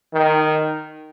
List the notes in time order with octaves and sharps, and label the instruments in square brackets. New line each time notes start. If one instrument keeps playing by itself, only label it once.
[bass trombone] D#3